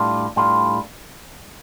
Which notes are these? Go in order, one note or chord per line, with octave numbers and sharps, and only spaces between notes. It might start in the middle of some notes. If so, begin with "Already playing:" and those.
Already playing: A2 G3 D4 F4
A2 G3 D4 F4